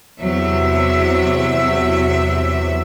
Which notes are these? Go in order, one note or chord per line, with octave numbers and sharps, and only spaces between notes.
E2 C3 F#3 E5